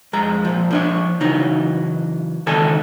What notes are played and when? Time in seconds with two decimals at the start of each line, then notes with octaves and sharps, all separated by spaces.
0.13 F2 G#3 A#5
0.45 A#2 F3
0.71 F3 D4 C#5
1.20 C#3 E3 F#3 D#4
2.47 C#2 D#3 A4 D#5 G#5 A5